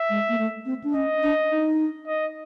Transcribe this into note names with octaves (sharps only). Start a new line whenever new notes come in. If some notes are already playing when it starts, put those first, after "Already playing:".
Already playing: E5
G#3
A#3
A3
C4
D4
C#4 D#5
D4
D#4
D#5